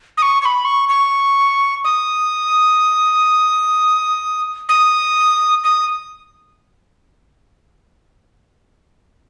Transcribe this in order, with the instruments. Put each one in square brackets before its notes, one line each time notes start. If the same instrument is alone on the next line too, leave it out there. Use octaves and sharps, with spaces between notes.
[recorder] D#6
C#6
C#6
B5
C#6
C#6
D#6
D#6
D#6